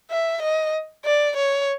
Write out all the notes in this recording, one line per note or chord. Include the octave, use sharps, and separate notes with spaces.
E5
D#5
D5
C#5